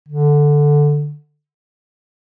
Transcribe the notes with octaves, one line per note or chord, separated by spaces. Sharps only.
D3